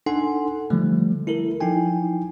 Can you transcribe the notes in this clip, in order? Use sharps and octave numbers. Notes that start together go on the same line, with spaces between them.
D4 D#4 A4 F#5 G#5 C6
D3 F3 G3 A3
E4 A4 A#4
F3 D#4 E4 G5 G#5